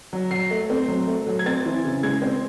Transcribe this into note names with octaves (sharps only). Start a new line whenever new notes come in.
F#3
F#3 C7
A3
C4
F#3
A3
F#3
G#6
C4 A6
E3
C#3
G#3 G#6
C4